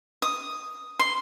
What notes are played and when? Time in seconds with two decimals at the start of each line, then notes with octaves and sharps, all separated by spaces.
0.22 D#6
0.99 C6